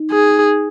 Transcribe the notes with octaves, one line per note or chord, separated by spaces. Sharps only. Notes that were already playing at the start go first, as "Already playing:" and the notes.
Already playing: D#4
G#4